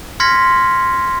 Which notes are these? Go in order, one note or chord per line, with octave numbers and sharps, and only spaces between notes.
C6 F6 G#6 A#6 B6 C#7